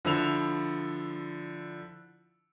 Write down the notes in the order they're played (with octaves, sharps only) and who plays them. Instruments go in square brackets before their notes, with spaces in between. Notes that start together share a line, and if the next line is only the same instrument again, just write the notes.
[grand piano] D3 F3 E4 E6 F7